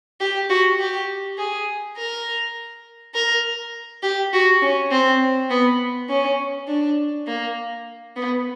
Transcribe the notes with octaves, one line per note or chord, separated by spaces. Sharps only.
G4
F#4
G4
G#4
A#4
A#4
G4
F#4
C#4
C4
B3
C#4
D4
A#3
B3